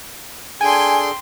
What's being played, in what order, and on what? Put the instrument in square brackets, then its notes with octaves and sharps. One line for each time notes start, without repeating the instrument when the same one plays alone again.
[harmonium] D4 G#4 A4 [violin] G5 C6 [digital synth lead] G#5